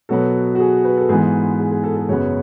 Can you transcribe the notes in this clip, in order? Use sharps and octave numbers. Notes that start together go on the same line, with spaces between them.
B2 F#3 B3 A4
F#4
G#4
B4
A4
G#2 E3 G#3 B3 G#4
G#4
G#4
A4
A4
F#2 C#3 F#3 B3 C#5